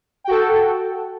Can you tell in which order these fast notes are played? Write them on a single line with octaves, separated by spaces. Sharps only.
G5 F#4 A4